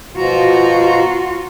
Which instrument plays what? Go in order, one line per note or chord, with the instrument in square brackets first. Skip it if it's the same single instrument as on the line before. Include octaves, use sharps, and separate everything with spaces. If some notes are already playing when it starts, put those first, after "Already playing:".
[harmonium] B2 F3 A#5 [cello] F4 F#4